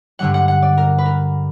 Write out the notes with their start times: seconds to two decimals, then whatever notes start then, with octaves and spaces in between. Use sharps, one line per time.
0.19 G2 D3 G3 F#5
0.34 F#5
0.48 F#5
0.62 D5
0.78 A#4
0.98 B4
1.06 A#4